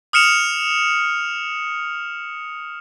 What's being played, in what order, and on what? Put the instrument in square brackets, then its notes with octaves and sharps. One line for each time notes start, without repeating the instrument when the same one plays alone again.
[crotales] D#6 F6 C#7 E7 F7